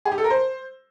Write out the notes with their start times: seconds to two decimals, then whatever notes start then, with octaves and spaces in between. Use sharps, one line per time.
0.05 G#4
0.12 G4
0.18 A4
0.24 A#4
0.30 C5